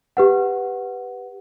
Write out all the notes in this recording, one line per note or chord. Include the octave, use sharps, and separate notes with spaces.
G4 B4 F#5